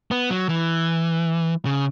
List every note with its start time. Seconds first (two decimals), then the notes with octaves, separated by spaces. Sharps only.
0.11 B3
0.30 F#3
0.49 E3
1.65 C#3